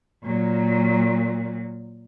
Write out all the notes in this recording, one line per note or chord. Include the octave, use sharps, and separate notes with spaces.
A#2 F#3